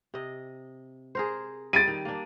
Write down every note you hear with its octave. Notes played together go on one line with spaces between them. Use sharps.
C3 D#5
G#4 A#4 C5
G3 A6 D7 D#7
D#3
A#3 D4